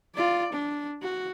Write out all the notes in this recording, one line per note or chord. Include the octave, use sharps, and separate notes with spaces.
F4 D5
D4
F#4